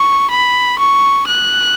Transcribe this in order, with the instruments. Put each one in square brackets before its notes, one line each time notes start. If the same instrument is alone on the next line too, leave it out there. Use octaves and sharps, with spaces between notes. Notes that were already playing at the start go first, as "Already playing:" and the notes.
Already playing: [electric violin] C#6
B5
C#6
F#6